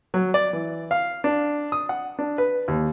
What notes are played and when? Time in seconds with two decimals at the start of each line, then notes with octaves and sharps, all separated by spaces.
0.14 F#3
0.34 D5
0.53 E3
0.91 F5
1.24 D4
1.72 D#6
1.89 F#5
2.19 D4
2.38 B4
2.68 D#2